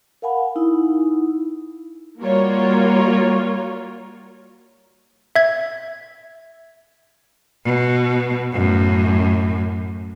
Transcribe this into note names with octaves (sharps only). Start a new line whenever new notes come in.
A#4 F5 F#5 G#5 B5
D#4 E4
G3 A#3 F4 F#4 A#4 C#5
E5 G#6
B2
F#2 A2